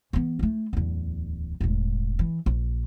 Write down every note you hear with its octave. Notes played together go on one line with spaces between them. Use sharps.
E3 B3
A3 E4
D1 E2
E1 A2
E3
A#1